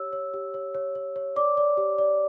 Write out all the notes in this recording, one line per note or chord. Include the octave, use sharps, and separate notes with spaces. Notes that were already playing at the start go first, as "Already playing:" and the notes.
Already playing: G4 C#5 E6
C#5
G4
C#5
C#5
C#5
C#5
D5 D6
D5
G4
D5